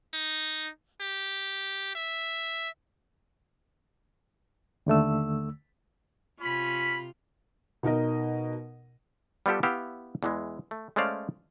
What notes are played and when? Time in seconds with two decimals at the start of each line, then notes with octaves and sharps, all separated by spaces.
0.14 D#4
1.01 G4
1.95 E5
4.86 D#2 D3 A3 E6
6.40 C3 C#4 F4 B5
7.83 B2 D#4 A#4 D#5
9.46 G3 B3 F4 G4 A4
9.63 B3 E4 G4 E5 F5
10.23 E2 E3 G#3
10.71 A3
10.96 G#3 A3 C#4 C5 D5 F5